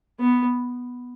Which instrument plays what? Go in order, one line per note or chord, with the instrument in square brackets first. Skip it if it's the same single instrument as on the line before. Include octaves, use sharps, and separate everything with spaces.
[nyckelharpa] B3